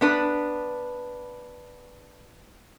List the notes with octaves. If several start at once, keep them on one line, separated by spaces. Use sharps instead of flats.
B3 D4 B4